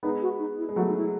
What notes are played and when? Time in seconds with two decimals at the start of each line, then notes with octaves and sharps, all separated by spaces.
0.03 G#3 B3 D#4
0.22 F#4
0.39 D#4
0.58 E4
0.69 G#3
0.76 F#3 A3 F#4
0.89 D#4
0.97 E4